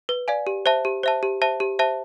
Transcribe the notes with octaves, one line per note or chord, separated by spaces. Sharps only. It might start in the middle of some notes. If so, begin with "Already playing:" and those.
B4
D5 F5 G#5
G4
C5 E5 A5
G4
C5 E5 A5
G4
C5 E5 A5
G4
C5 E5 A5